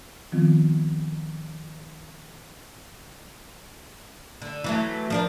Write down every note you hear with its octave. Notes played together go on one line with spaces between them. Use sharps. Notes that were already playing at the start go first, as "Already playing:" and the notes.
D#3 F3 G3 B3 C4 F4
D3
E3 F#3 A3
F3 D4 A#4